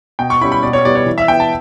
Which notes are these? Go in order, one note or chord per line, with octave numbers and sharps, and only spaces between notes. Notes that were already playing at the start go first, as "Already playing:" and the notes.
B2 G5
C#6
G3 C#4 E4 B5
B5
B2 D5
C#5
G3 B3 E4 D5
C#5
E3
E5
B3 E4 G5
A5